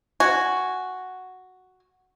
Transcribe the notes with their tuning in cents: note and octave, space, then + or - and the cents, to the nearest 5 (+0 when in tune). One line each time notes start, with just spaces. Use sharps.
F#4 +0 G#5 +0